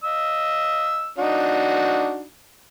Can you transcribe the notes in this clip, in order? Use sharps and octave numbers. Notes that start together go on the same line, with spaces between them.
D#5 E6
D4 D#4 F#4